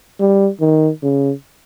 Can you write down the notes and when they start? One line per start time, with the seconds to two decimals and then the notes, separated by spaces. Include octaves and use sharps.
0.20 G3
0.61 D#3
1.03 C#3